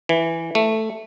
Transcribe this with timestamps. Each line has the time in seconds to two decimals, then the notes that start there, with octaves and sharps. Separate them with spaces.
0.09 E3
0.55 A3